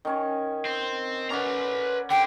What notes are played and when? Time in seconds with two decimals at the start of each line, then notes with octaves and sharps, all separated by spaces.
0.05 D#3 C#4 C#5
0.65 C4
1.30 C#4 B4 D5 F#5 A#5
2.11 D3 G5